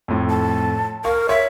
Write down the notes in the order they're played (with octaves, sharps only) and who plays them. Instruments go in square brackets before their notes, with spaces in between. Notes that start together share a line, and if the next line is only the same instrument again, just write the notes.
[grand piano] F2 A2
[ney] A5
[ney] A#4 [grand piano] F5 C#6
[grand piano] C#5 [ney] E5